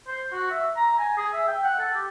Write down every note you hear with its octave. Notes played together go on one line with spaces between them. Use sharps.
C5
F#4
E5
A#5
G#5
G#4
E5
G5
F#5
A4
G4